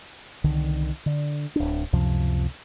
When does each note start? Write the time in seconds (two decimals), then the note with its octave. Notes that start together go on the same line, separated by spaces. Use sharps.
0.44 C2 D3 D#3
1.06 D3
1.56 D1 D4
1.93 C#2 F#2 C3 F3